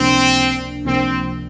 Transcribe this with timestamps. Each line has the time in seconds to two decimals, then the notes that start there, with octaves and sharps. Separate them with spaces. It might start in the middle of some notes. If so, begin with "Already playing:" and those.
Already playing: C#2 C3 F3 A#3 C4 D4
0.85 C#2 C3 F3 A#3 C4 D4